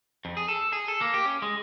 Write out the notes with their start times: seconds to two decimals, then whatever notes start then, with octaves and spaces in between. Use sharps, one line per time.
0.25 F2
0.37 G#4
0.48 A4
0.73 G#4
0.88 A4
1.01 A#3
1.14 G4
1.25 C#4
1.42 G#3